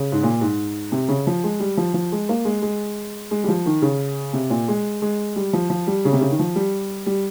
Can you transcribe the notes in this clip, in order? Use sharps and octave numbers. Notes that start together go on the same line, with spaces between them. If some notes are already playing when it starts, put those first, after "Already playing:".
Already playing: C#3
G#2
A#2
G#2
C3
C#3
F3
G#3
G3
F3
F3
G#3
A#3
G#3
G#3
G#3
G3
F3
D#3
C#3
C3
A#2
G#3
G#3
G3
F3
F3
G3
C#3
C3
C#3
D#3
F3
G3
G3